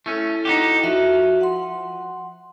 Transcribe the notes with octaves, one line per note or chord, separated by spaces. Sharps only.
A3 C#4 E4 A4
D#4 F#4 G4
F3 F#4 E5
F#5 C6